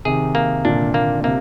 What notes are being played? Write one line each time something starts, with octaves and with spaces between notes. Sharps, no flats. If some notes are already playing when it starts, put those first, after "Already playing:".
C3 D#3 G#4
A#3
A#2 D3 D4
A#3
C3 A#3